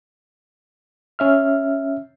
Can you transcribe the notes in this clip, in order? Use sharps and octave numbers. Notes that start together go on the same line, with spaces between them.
C#4 E5 F6